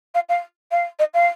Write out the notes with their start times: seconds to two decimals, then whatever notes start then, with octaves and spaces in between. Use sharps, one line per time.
0.14 F5
0.29 F5
0.71 F5
0.99 D#5
1.14 F5